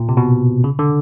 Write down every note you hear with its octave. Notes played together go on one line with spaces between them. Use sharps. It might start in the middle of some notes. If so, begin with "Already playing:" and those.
Already playing: A#2
C3
B2
C#3
D3